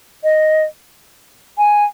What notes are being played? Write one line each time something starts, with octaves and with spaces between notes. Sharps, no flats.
D#5
G#5